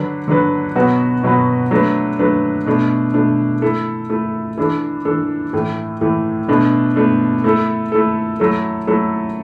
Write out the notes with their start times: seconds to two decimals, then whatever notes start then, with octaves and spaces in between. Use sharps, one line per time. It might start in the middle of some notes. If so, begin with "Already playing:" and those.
Already playing: D3 F#3 D4 B4
0.28 D3 F#3 D4 B4
0.75 B2 F#3 B3 F#4 B4
1.23 B2 F#3 B3 F#4 B4
1.71 F#3 A3 D4 B4
2.19 F#3 A3 D4 B4
2.66 B2 A3 D4
3.14 B2 A3 D4
3.62 A3 E4 A4
4.10 A3 E4 A4
4.58 E3 D4 A4
5.05 E3 D4 A4
5.53 A2 E3 A3
6.01 A2 E3 A3
6.48 B2 A3 D4
6.96 B2 A3 D4
7.44 A3 E4 A4
7.92 A3 E4 A4
8.40 F#3 A3 E4 A4
8.87 F#3 A3 E4 A4